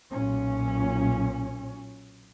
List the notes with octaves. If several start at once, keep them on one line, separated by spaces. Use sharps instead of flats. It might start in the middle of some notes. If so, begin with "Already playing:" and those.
B1 A#2 C#4